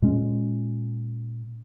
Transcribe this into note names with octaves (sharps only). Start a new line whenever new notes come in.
A#2 G#3 C#4